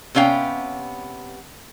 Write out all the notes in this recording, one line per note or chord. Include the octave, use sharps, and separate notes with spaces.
C3 B3 C#4 F5 G5